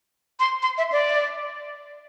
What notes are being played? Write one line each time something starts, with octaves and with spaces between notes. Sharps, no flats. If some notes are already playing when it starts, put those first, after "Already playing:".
C6
C6
E5
D5